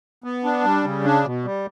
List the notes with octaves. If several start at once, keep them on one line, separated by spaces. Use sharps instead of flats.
B3
D4
G3
C#3
D4
B2
G3